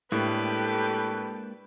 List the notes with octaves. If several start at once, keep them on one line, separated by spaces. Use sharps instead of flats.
A2 G#3 A#3 D4 G4 A4 B4